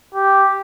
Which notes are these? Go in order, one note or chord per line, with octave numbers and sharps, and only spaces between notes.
G4